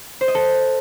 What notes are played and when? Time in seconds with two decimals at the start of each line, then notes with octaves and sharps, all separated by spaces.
0.21 C5
0.28 D#5
0.35 A4